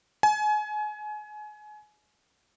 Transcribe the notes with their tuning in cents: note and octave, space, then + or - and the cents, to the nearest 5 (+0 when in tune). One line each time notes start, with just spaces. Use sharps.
G#5 +30